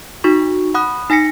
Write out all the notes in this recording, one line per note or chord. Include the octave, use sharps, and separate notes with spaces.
D#4 F#4 C#6
F#5 B5 D#6 F#6
D#4 G#5 A#6 B6 C#7